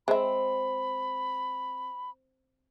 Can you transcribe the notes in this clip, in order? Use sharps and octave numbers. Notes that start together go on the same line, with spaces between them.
G#3 C4 E5 B5